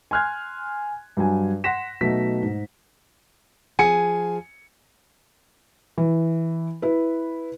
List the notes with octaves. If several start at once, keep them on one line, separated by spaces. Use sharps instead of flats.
G#5 C6 F6 F#6 G#6
G2 F#3 G#5
F#5 C6 A#6 B6 E7
B2 F#3 A3 D#4 B6
G#2
F3 G#4 G#5 C#7
E3
E4 B4